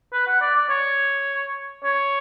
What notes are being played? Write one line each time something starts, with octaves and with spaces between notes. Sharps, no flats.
B4
F#5
D5
D5
C#5
C#5